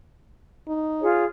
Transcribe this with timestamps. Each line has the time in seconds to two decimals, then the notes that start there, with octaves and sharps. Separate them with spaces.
0.68 D#4
1.01 F4 G#4 C#5